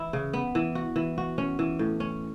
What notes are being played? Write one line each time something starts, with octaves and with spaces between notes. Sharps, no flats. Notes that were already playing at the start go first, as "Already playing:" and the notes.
Already playing: E3 E4
C#3
B3
E3
F#4
E3
F#4
C#4
E3
A2
C#4